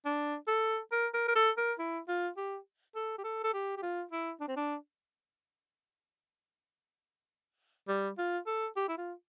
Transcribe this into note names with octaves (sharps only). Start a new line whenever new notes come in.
D4
A4
A#4
A#4
A#4
A4
A#4
E4
F4
G4
A4
G4
A4
A4
G4
G4
F4
E4
D4
C4
D4
G3
F4
A4
G4
E4
F4